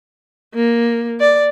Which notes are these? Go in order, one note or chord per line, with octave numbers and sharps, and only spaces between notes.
A#3
D5